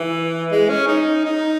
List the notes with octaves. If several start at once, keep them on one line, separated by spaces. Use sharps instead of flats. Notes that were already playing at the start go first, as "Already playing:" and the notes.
Already playing: E3
G#3
C#4
D#4
D#4